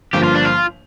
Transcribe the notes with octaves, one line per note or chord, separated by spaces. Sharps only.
G1 G2 F3 A#3 G4
F4
D4
F4